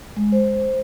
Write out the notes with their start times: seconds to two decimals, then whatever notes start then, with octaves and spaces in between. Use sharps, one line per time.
0.17 G#3
0.32 C5